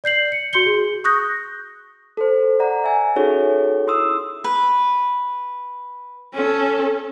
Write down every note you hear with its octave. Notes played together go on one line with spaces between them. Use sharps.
D5 G6 C7 F#7
C#7
F#4 C6 G6 C#7 G7
G#4
C#6 D#6 F#6 G6 A#6
A4 C5
D5 F#5 A#5
E5 G#5
C#4 D#4 F#4 G#4 A4 C#5
E4 C6 D#6 E6
B4
C#4 A4